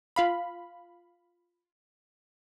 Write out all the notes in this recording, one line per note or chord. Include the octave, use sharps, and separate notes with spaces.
F4 F5 B5